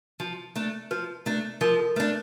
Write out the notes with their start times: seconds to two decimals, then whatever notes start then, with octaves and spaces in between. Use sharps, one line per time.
0.20 F3
0.56 A3 D4
0.91 F3 B4
1.26 A3 D4
1.61 F3 A#4
1.79 A4
1.96 A3 D4 B4